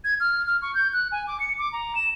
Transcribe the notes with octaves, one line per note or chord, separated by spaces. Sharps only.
G#6
F6
F6
C#6
G6
F#6
G#5
D6
C#7
D6
A#5
E7